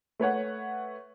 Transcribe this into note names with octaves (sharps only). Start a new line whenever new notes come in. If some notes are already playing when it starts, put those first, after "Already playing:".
A3 B4 C#5 F#5